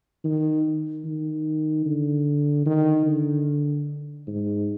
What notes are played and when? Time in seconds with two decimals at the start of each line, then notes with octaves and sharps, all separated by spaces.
0.24 D#3
1.05 D#3
1.86 D3
2.66 D#3
3.06 D3
4.27 G#2